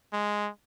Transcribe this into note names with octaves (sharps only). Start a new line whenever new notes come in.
G#3